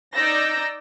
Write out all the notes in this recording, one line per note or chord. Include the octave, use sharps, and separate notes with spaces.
D#4 D5 E6 G6 A#6